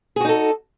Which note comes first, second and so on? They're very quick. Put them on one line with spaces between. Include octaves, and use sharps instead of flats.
G#4 F#4 D#4 A4